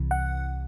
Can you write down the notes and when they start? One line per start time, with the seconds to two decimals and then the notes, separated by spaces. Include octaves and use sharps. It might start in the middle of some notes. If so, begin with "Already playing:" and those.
Already playing: C2 C3 E3
0.11 F#5